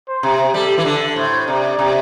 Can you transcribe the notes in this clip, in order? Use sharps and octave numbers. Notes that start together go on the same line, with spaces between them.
C5
C3
G3 A4
E3
D3 A4
A2 C5
C3 D5
C3